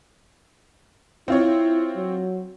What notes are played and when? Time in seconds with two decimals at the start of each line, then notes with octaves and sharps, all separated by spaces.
1.28 C4 E4 F4 C#5
1.96 F#3